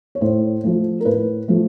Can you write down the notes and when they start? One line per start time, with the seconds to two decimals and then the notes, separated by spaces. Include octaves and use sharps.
0.15 C#5
0.21 A2 C5
0.63 F3 A3
1.00 A#4
1.05 A2 B4
1.48 F3 A3